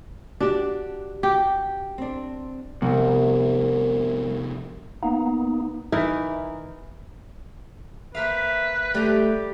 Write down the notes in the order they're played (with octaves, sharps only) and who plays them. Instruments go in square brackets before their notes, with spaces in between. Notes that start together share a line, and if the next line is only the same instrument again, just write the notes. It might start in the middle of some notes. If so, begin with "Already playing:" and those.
[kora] D4 [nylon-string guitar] F#4 G4
[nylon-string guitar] F#4 [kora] G4
[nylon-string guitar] C4 D4
[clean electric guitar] C2 [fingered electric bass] C3 F3 B3
[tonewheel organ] A#3 B3 D#4
[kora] E3 D#4 E4 A#4
[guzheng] A#3 C5 F5 [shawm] B4 [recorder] E5
[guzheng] G3 A#5 C6 [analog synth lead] A3 [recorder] G4